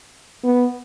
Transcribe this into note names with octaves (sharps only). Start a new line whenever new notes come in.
B3